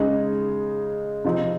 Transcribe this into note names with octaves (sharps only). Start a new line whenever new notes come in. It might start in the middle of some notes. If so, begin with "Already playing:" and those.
Already playing: C#3 G#3 D#4
C3 F3 C4 D#4